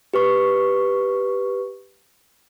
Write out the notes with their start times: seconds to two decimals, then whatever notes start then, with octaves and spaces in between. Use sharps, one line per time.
0.14 G4 B4 C#6